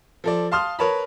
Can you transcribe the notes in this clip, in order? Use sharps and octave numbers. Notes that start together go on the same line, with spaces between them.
F3 A4 D5
F5 A5 C6 D#6 F6
A#4 B4 C#5 A5 B5